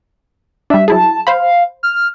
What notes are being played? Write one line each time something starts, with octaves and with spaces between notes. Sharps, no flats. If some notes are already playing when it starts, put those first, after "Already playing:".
G3 D4 E5
F#3 E4 G#4 A5
C5 F5 B5
F6